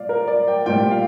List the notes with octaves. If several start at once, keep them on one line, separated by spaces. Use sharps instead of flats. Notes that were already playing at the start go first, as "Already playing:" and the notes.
Already playing: A#2 G3 D5 F5
A#4
D5
G5
A#2 G3 G5
F5